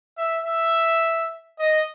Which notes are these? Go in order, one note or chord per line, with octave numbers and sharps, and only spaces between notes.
E5
E5
D#5